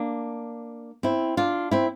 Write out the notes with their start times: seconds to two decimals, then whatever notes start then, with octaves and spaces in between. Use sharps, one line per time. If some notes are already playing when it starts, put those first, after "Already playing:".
Already playing: A#3 D4
1.03 C4 E4
1.37 D4 F4
1.71 C4 E4